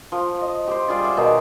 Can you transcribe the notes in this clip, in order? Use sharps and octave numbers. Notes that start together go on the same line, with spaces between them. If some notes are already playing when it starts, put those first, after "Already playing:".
F3
D#5
G4 C5
G3 F4 G#4 D5
D5 E5 F#5
B2 D#3 D#4